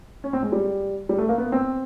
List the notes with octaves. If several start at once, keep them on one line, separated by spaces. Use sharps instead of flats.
C#4
C4
G#3
G3
G3
A3
A#3
B3
C4